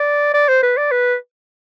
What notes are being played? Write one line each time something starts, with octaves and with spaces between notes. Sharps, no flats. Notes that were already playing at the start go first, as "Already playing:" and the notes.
Already playing: D5
D5
C5
B4
D5
B4